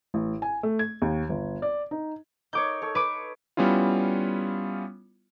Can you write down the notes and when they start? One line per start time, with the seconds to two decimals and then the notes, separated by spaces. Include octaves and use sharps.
0.14 A1
0.42 G#5
0.63 A3
0.79 G#6
1.02 D#2
1.29 G1
1.62 D5
1.91 D#4
2.53 D#4 A#4 C#5 D6 G6
2.82 A4 C#5
2.95 B4 D6
3.57 G3 B3 C#4 E4 F4